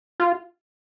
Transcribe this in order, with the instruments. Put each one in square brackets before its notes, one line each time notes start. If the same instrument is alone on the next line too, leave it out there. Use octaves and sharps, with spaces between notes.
[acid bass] F4